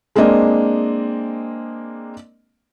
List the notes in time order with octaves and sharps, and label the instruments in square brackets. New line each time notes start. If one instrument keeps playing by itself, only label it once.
[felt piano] G#3 A#3 C4 D4 D#5